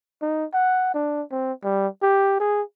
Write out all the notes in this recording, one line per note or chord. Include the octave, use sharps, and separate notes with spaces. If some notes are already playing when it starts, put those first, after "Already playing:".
D#4
F#5
D4
C4
G3
G4
G#4